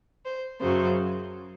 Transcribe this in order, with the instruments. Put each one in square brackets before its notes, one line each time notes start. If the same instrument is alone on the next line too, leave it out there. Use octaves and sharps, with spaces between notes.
[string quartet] C5
F#2 C#3 F#3 C5